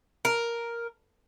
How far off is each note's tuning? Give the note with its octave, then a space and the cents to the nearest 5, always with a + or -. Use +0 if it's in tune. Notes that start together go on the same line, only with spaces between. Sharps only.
A#4 +5